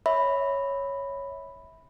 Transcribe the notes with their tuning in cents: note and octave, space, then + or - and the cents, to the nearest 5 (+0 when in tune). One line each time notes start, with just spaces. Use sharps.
C#5 +0 E5 -20 B5 +0